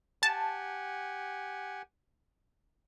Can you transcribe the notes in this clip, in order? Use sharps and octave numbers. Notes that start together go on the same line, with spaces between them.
G4 F#5 G#5 A5